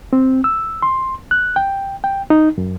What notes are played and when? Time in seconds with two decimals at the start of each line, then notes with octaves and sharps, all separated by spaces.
0.13 C4
0.44 E6
0.82 C6
1.31 F#6
1.56 G5
2.04 G5
2.30 D#4
2.58 F#2